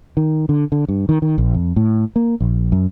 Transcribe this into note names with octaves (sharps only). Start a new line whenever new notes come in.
D#3
D3
D3
G2
D#3
D#3
A#1
F2
A2
A#3
A#1
F#2